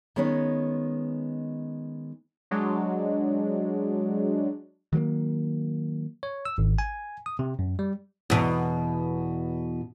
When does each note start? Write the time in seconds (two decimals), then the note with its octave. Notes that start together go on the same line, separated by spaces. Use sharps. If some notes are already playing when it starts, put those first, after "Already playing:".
0.16 D#3 G#3 B3 C#4 B4 C#5
2.51 F#3 G#3 D4
4.93 D#3 F#3 A3 A#3
6.23 C#5
6.45 E6
6.58 G#1
6.78 G#5
7.26 D#6
7.39 C3
7.59 F#2
7.79 G3
8.30 E2 B2